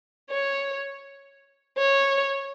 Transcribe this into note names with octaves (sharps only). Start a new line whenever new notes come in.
C#5
C#5